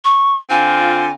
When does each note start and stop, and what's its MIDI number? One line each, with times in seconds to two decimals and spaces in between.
0.05 0.36 85
0.50 1.10 50
0.50 1.10 60
0.50 1.10 65
0.50 1.12 80